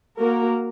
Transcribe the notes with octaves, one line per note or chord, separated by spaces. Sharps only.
A#3 F#4 A#4